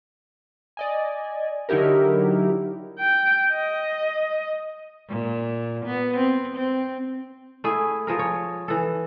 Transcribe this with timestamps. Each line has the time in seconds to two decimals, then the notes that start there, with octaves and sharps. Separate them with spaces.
0.77 D5 D#5 G#5
1.69 D3 F#3 D#4 E4 G4 A#4
3.00 G5
3.52 D#5
5.09 A#2
5.85 B3
6.16 C4
6.57 C4
7.64 A3 E4 G#4
8.07 F3 G#4 A#4
8.19 C#5
8.68 E3 A4